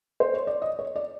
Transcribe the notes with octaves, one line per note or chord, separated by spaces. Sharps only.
C5
C#5
D5
D#5
C#5
D5